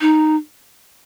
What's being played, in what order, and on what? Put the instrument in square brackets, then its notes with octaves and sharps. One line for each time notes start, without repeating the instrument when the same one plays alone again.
[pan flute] D#4